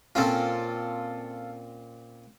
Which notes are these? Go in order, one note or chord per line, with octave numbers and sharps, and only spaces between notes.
A#2 C4 C#4 F4 A4